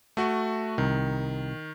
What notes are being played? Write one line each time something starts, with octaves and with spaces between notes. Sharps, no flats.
A3 F#4
C2 D#3